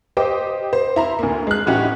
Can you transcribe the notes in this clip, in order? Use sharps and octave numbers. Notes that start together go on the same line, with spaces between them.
G4 C5 D#5 G5 D6
C5
E4 A#5 C6
D2 A#3
G#3 F#6
A2 E3 C#4 D#4 F#4 G4